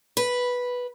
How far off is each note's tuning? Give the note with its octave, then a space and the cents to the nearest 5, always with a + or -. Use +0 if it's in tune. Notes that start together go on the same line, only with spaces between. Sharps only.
B4 -5